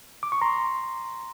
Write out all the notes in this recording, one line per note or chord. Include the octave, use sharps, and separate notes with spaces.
D6
C#6
A#5 C6